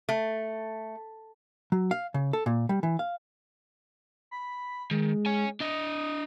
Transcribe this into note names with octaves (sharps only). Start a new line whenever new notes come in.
A3
F#3
F5
C#3
A4
A#2
G3
E3
F5
B5
D#3 G#3
C#5 G#5
D4 D#5 D#6